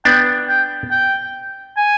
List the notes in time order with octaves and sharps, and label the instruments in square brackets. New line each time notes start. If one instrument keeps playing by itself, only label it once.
[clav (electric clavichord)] B3 D4 [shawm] G5
[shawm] G5
G5
G#5